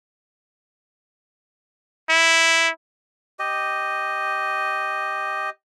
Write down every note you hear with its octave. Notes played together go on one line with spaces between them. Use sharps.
E4
G4 D#5